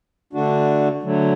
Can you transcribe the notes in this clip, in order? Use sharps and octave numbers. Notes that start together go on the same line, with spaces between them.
D3 A3 D4 F#4
D3 F#3 A3